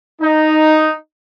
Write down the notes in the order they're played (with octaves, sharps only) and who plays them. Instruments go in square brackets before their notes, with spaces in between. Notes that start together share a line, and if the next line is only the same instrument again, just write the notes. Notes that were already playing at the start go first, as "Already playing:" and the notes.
[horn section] D#4